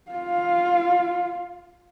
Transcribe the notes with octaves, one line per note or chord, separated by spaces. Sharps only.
F4 F5